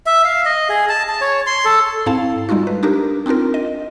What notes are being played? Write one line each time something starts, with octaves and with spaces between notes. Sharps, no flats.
E5
F5
D#5
G#4
A5
A5
C#5
C6
A4
G#2 C4 E4 A4 F5 A5
G3 G#3 D#4 F4 F#4
B4
D4 D#4 G4 A#4
C4 D4 D#4 F4 A#4
D#5